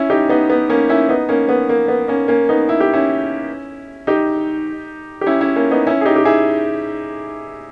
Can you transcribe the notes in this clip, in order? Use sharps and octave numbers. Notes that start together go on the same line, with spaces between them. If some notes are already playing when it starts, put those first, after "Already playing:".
Already playing: C#4 E4
D#4 G4
B3 D#4
B3
A#3 C#4
C#4 E4
B3 D#4
A#3 C#4
B3
A#3
B3
A#3 C#4
A#3 C#4
B3 D#4
E4
G4
C#4 E4
D#4 G4
G4
C#4 E4
C#4 E4
A#3 C#4
B3 D#4
C#4 E4
G#4
D#4 G4
G4
E4 G#4